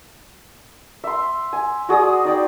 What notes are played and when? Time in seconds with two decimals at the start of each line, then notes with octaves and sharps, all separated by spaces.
1.04 E5 C6
1.53 G#5
1.89 F#4 G#4 D5 D#6
2.25 D#4 D5 G5